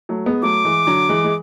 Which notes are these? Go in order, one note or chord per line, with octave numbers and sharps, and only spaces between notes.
F#3 A3
G#3 B3
F#3 A3 D6
E3 G#3
D3 F#3
E3 G#3
G#3